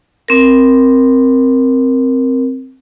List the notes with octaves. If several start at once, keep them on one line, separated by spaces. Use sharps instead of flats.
C4 A#4